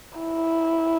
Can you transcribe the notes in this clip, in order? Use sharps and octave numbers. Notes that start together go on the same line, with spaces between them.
E4